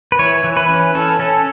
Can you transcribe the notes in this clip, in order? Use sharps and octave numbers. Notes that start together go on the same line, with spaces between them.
B4
E3 C#5
E3
B4
C#4
C#4 A4
C#4 A4